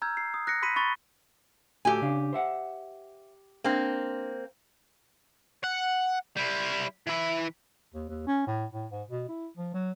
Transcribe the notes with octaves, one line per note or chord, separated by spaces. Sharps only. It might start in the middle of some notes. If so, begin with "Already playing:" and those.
A#5 E6 F6 G6 G#6
C7
D#6
F#6 A#6 C7 C#7
B5 C6 B6 C#7 D#7
B5 C#6 A6 G7
A2 F#4 G4 A4 G#5
C#3 D4 F5
C5 E5 F#5
A#3 C4 D4
F#5
G3 E4
E3 E4
D#2
D#2
C#4
A2
A2
G#2
B2
E4
F3
F#3